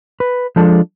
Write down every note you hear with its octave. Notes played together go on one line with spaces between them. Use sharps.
B4
F3 G#3 D4 A4